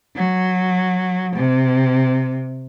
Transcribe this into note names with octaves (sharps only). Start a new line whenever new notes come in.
F#3
C3